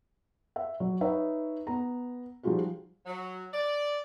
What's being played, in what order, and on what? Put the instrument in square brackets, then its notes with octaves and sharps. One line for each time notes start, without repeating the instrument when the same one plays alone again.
[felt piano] E5
F#3
D#4 B4 C#5 E5
B3 A#5
F3 G3 D#4 F4 F#4 G#4
[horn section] F#3
D5